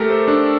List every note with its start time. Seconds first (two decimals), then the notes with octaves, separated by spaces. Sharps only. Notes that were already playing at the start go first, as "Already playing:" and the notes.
Already playing: A3 G4 A4 A#4
0.10 C5
0.28 D4